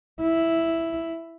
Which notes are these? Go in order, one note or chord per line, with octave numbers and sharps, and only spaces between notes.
E4